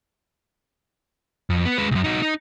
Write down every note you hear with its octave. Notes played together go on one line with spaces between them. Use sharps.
F2
B3
G#3 B4
C2 F#2
D#4 F#4
D#4